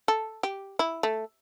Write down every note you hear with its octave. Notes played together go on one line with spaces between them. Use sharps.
A4
G4
E4
A3